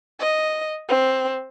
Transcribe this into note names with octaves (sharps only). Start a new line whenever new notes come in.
D#5
C4